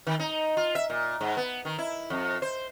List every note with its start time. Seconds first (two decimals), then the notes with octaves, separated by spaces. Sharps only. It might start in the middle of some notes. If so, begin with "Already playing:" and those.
0.07 D#3
0.19 D#4
0.57 F4
0.75 E5
0.90 A#2
1.21 G#2
1.37 B3
1.65 D#3
1.78 E4
2.10 F2
2.42 C5